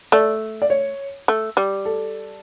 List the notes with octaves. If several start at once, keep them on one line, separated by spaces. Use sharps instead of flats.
A3 D5
D5
C#5
A3
G3
A4